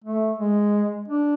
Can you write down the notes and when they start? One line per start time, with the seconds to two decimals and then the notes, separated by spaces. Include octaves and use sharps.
0.04 A3
0.38 G#3
1.08 D4